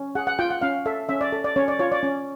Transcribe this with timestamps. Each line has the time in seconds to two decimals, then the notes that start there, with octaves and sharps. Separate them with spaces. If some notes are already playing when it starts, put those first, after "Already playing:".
Already playing: C#4
0.15 G#4 F#5
0.27 F#5
0.39 F4 G5
0.51 F#5
0.62 C#4 F5
0.86 A4 E5
1.09 C#4 E5
1.21 D5
1.32 A4
1.44 D5
1.56 C#4 C#5
1.68 D5
1.79 F4 C#5
1.92 D5
2.03 C#4